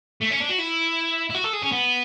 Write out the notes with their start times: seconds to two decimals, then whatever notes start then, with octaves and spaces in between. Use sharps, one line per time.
0.22 A3
0.31 C#4
0.41 D4
0.50 F#4
0.59 E4
1.30 E4
1.35 F#4
1.44 A4
1.53 G#4
1.62 C#4
1.72 B3